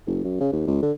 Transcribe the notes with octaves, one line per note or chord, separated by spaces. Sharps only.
F#1
F#2
C#3
D#2
C#2
D3